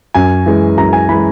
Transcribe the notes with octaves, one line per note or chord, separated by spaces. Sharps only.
F#2 G#5
E3 G#3
F#2 A#5
G#5
E3 G#3 B5